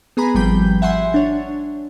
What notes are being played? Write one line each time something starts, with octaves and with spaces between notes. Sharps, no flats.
B3 G#4 G#5 A#5 B5
G#1 F3 G3 G5 B5 G6
E5 F#5 G#5 C6
D4 C#5